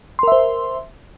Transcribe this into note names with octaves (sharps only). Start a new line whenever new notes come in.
A#4 C5 E5 C6